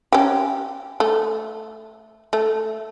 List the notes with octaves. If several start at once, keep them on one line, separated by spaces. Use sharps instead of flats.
C#4 G4
A3
A3